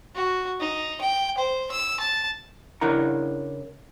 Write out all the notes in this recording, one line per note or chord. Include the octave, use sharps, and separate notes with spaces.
F#4
D#4
G5
C5
E6
A5
C#3 D4 E4 A#4 F#5 A#5